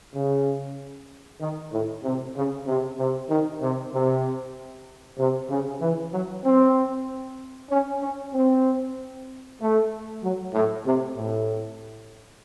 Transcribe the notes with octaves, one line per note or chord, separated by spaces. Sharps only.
C#3
D#3
A2
C3
C#3
C3
C3
D#3
C3
C3
C3
C#3
E3
F#3
C4
C#4
C#4
C4
A3
F#3
A2
C3
A2